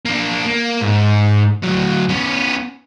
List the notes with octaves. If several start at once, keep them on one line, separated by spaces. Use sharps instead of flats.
A#3 D4
A#3
G#2
D2 F#3
B3 C#4